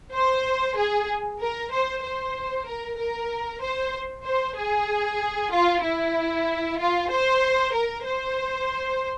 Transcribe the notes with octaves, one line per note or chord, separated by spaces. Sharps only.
C5
G#4
A#4
C5
C5
A#4
A#4
C5
C5
G#4
F4
E4
F4
C5
A#4
C5